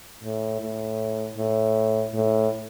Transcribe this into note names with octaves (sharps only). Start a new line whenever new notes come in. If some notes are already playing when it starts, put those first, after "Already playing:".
A2
A2
A2
A2